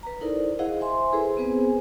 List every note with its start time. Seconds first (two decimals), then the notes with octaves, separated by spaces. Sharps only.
0.03 B4 A#5
0.21 D#4 E4 A4 A#4 C5 D5
0.59 E4 G#4 C5 D#5 F5 F#5
0.80 C5 E5 G#5 C6
1.12 E4 G#4 A4 B4 C5
1.37 B3 C4 G#4 B4 C5 G#5